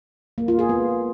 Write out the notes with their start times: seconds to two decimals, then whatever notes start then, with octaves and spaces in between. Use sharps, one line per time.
0.38 A#3
0.48 F4
0.59 G#4
0.69 B3